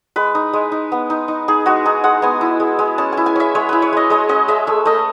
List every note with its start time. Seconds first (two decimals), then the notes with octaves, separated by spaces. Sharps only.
0.16 G#3 B4
0.35 D#4
0.53 G#3
0.72 D#4
0.92 B3
1.10 D#4
1.28 D#4
1.48 D#4 G#4
1.66 G#3 F#4
1.86 D#4 G#4
2.04 G#3 F#5
2.22 B3 G#5
2.41 E4
2.60 G#3
2.79 G#3
2.98 C#4 A5
3.13 E4 G#5
3.26 G#5
3.36 C#4 E5
3.55 G#3 C#5
3.69 E4 B4
3.82 C#5
3.93 G#3 D#5
4.10 G#3 D#5
4.29 C#4 D#5
4.48 G#3 E5
4.67 A3 E5
4.85 A3 D#5